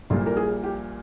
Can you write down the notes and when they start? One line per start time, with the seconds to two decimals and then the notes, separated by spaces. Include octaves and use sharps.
0.10 A#1 A#2 G3 A#3 F4
0.26 A#4
0.37 G#4
0.64 G4